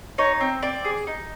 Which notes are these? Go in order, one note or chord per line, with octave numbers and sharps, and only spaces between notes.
D#4 C#5
C4
C4 D5
G#4
D#4